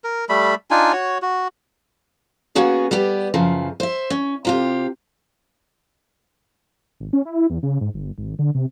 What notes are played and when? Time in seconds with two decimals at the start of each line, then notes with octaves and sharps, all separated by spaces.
0.04 A#4
0.29 G3 A3 B5
0.71 D4 D#4 F4 G#5
0.93 F#4 C#5
1.22 F#4
2.55 A#3 B3 C#4 F#4 G#4
2.91 G3 B3 G4
3.34 F#2 C#3 E3 F3
3.80 C5 E5
4.10 C#4
4.45 C3 F4 G4
7.00 G#1
7.13 C#4
7.25 E4
7.50 E2
7.63 C#3
7.81 G#2
7.94 G1
8.18 G#1
8.39 D3
8.55 C3